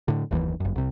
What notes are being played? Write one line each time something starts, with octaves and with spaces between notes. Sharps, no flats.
A2 D3
F#1 D#2 B2 E3
G1 F#2
C2 C3